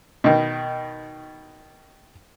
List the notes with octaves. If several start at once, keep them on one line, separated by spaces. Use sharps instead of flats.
B2 D#3